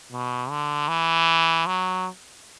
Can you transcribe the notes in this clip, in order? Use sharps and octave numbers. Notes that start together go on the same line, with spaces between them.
B2
D3
E3
F#3